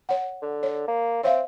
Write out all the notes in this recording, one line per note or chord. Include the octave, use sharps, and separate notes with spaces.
C#5 F#5
D3
C#5
A#3
C4 C#5 E5 F5